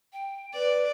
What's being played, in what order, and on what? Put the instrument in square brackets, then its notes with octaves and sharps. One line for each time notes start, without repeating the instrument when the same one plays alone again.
[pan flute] G5
[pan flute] B4 [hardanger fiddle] D5